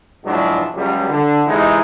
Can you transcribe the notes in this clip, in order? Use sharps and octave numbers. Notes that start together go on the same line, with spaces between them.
E2 G#2 B2 F3 F#3 D4
C#2 F#3 G3
D3
C3 E3 G#3 D#4